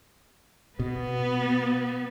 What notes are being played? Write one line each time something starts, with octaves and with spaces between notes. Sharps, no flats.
B2 B3